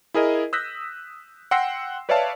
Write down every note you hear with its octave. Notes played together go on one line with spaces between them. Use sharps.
E4 G#4 A#4 D#5
D#6 E6 F#6 G6 A#6 B6
F#5 G5 C6 E6 A#6 C7
B4 C#5 D5 E5 F5 A5